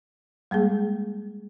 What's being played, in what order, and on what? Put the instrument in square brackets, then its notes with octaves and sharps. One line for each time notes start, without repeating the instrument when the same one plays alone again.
[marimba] G3 G#3 A#3 G#4